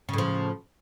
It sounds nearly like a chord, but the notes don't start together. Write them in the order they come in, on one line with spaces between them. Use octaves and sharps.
C#3 A2 F3